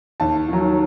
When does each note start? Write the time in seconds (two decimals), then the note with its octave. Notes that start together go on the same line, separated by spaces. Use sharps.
0.20 D#2 A5
0.49 D#3 F#3